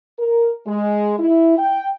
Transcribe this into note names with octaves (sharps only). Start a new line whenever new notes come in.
A#4
G#3
E4
G5